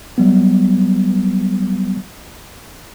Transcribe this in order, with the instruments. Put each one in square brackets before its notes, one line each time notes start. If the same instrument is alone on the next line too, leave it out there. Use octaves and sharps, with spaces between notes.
[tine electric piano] F#3 G3 B3